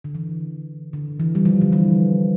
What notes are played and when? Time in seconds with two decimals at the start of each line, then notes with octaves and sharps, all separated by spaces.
0.04 D3
0.15 E3
0.93 D3
1.20 E3
1.35 G3
1.45 F3
1.61 D3
1.72 E3